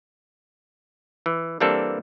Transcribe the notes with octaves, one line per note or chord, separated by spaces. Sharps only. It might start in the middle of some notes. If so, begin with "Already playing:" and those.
E3
E3 G3 A#3 C4 D4 A4